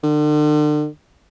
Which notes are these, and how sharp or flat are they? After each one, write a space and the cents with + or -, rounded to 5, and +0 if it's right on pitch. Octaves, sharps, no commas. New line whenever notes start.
D3 +40